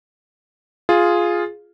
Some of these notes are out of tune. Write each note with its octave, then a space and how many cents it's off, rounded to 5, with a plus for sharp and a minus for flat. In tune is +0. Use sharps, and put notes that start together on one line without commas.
F4 +0 G#4 +0